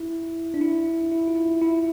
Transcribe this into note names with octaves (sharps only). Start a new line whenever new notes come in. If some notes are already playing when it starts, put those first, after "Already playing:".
Already playing: E4
D4
E4
E4
F4
E4
E4